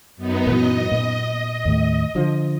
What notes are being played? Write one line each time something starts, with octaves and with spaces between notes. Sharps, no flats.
F#2 B3 D#4
A#2 E3 F#3 D#5
A#2
D#2 A2
D3 F3